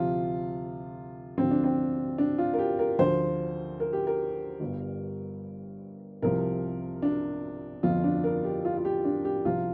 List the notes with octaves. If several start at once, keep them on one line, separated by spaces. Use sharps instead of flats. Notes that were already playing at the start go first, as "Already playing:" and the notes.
Already playing: D2 C3 F3 F4
D2 D3 F3 C4
D4
C4
D4
F4
A#4
G4
A#4
D2 D3 F3 C5
A#4
G4
A#4
G1 G2 G3
C2 C3 F3 A#4
D4
G1 F2 F3 F4
D4
A#4
G4
F4
F4
G4
D4
G4
C2 C3 F3 F4